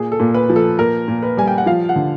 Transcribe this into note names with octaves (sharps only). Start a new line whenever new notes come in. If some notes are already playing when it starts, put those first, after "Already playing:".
Already playing: A#2 G#4
A4
A#2
B4
F3
A4
A#2 A#4
A#2
B4
G3 G#5
G5
F#5
F3 F5
F#5
D3